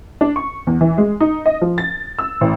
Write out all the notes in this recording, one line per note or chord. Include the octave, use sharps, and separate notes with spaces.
D4
C#6
E2
E3
G#3
D#4
D#5
F3
A6
E6
A1